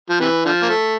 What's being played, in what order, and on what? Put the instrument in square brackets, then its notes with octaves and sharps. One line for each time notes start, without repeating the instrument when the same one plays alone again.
[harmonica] F3
C3 E3
D3 F3
A#3
A3